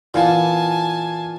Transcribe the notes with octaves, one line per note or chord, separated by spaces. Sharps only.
A#2 E3 B3 F5 G#5 A5